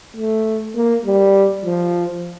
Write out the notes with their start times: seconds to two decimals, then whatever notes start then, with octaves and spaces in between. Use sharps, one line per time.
0.16 A3
0.75 A#3
1.05 G3
1.64 F3